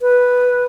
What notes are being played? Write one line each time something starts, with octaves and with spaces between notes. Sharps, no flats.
B4